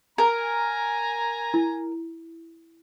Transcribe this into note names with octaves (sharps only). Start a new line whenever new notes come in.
A#4 G#5 A#5
E4